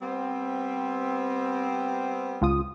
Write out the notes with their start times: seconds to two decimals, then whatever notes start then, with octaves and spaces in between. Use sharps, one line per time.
0.02 G3 B3 C4
2.41 C#2 F4 D#6